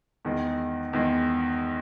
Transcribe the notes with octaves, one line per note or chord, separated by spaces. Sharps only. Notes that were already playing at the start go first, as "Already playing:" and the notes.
E2 D#3 G#3
E2 D#3 G#3